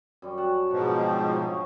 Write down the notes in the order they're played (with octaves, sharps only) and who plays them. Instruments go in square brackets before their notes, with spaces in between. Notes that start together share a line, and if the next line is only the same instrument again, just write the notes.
[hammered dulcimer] F#2 G3 C#4
F#5 A5
[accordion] G#2 B2 F3 [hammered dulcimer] F#5
[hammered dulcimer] D#4 G4
G2
G#4 C#5